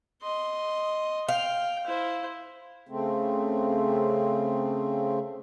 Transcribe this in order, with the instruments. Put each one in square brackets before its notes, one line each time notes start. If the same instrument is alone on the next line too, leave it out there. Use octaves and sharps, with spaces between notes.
[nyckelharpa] D#5 C6
[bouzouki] F5 [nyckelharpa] G5
[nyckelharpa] E4 C5
[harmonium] C#3 A3 C4